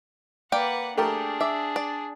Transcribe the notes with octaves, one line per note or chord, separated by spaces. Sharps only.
A#3 B4 D5 F#5 G5
A3 D4 G4 G#4 A#4
E5 D6
D5